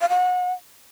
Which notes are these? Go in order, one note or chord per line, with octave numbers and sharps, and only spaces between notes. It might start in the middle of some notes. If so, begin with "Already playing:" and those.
F5
F#5